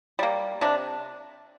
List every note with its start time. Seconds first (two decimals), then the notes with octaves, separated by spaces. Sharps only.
0.19 G3 A#3
0.61 C3 D4